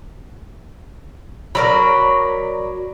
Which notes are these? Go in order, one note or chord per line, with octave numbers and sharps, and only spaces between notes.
F#3 A#4 D5 B5